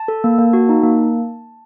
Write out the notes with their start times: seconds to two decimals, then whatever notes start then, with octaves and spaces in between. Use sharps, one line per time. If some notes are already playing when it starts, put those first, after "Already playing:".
Already playing: A5
0.08 A4
0.24 A#3
0.39 A#3
0.53 F#4
0.69 D#4
0.83 A#3